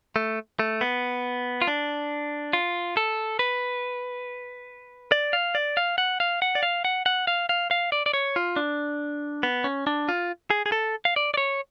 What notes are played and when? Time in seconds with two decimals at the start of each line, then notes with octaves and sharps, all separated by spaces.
0.16 A3
0.59 A3
0.81 B3
1.62 F4
1.68 D4
2.53 F4
2.97 A4
3.39 B4
5.12 D5
5.33 F5
5.55 D5
5.77 F5
5.98 F#5
6.20 F5
6.42 F#5
6.55 D5
6.63 F5
6.85 F#5
7.06 F#5
7.27 F5
7.49 F5
7.71 F5
7.92 D5
8.06 D5
8.14 C#5
8.36 F4
8.56 D4
9.43 B3
9.64 C#4
9.87 D4
10.09 F4
10.50 G#4
10.66 G#4
10.72 A4
11.05 F5
11.16 D5
11.34 D5
11.37 C#5